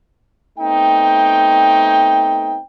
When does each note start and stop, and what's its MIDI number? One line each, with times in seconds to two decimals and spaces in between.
0.59 2.60 57
0.59 2.60 59
0.59 2.60 60
0.59 2.60 63
0.59 2.60 79